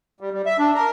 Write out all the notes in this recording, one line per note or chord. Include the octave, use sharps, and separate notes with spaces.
G3
G3
E5
D4
A#4